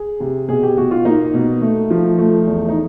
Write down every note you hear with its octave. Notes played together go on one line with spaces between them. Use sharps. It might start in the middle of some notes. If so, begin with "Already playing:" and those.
Already playing: G#4
C3
B2 G#4
G4
B2 F#4
F4
A#3 D#4
B2
A3
F3
A3
E2
D#4